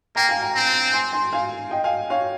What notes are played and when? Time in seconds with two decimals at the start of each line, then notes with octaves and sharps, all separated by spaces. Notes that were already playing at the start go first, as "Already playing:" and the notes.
0.16 A#3 G5 A#5
0.29 F5 G#5
0.42 G5 A#5
0.55 C4
0.93 G#5 C6
1.13 G#5 C6
1.33 F5 G#5
1.71 D#5 G5
1.84 F5 G#5
2.10 C#5 F5